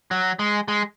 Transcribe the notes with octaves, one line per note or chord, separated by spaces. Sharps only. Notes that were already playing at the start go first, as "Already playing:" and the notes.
F#3
G#3
G#3